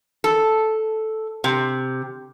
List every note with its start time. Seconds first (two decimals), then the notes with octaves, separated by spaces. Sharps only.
0.24 A4
1.44 C3